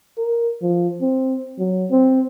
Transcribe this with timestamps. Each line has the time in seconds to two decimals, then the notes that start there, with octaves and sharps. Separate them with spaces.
0.18 A#4
0.62 F3
1.01 C4
1.59 F#3
1.91 C4